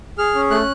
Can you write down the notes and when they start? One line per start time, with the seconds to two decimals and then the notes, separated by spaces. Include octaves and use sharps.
0.18 G#4 F6
0.35 C#4
0.51 A3 F#6